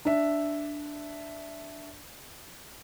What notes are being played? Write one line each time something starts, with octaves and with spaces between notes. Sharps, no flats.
D4 E5